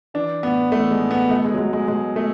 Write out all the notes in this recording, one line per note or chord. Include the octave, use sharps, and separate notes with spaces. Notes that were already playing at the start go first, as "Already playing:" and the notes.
E3 D4
A2 B3
E3 A3
G#3
A2
B3
B2 A3
G#3
F#3
B2 G#3
G#3
B2 G#3
B2 A3